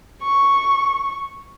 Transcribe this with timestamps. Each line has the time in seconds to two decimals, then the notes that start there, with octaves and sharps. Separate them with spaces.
0.23 C#6